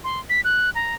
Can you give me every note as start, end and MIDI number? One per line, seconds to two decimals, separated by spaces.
0.04 0.20 84
0.30 0.41 95
0.45 0.70 90
0.75 0.95 82